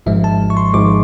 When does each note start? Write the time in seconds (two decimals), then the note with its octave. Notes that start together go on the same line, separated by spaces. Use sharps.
0.06 G#1 G#2 F3 G#3 E5
0.24 A5
0.50 C#6
0.57 C6
0.73 G#1 G#2 F3 G#3 D6